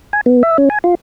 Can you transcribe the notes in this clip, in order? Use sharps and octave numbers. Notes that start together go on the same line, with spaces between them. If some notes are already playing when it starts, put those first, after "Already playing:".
G#5
B3
E5
C#4
G#5
F4